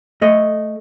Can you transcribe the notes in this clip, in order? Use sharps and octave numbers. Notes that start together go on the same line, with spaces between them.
A3 D#5